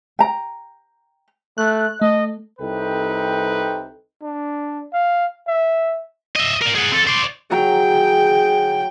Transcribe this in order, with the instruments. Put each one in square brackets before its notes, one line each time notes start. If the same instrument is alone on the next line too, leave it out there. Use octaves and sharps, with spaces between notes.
[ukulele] G5 A#5
[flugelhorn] A3 [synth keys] F#6
[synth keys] A3 [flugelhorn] D#5
[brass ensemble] C2 C3 D#4 A4 B4 G5
[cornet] D4
F5
E5
[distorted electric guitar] D#5 E5
A#4 D5
G#4 F#5
C4 A4
C5 D5
[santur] F#3 A#5 [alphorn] G#4 [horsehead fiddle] G5